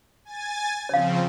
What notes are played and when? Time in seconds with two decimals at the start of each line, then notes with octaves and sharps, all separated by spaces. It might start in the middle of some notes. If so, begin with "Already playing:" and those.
0.25 G#5 A6
0.89 C#3 F3 C4 C#5 F5